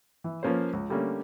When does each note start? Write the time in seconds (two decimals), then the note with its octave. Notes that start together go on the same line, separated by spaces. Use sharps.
0.24 E3
0.43 F3 A#3 C#4 B4 C5
0.73 C#2
0.89 D3 G3 A3 A#3 C#4